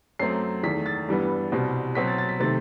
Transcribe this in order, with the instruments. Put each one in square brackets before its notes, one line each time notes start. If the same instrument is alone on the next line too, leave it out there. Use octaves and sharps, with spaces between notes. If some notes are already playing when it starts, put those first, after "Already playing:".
[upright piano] F#2 F#3 A3 C4 C7
E2 D#3 A3 B6
A6
G2 E3 G3 B3
C2 B2 G3 C4
B2 F#3 C4 B6
A6
A6
B6
C3 D#3 A3 C4 A6